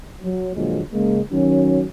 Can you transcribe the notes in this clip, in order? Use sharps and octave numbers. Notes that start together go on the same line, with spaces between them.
F#3
A#2 D3 F3 F#3 G#3 A#3
C#3 G#3 A#3
D#3 F#3 C#4